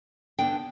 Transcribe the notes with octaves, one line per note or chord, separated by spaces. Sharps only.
D2 D3 B3 D4 G5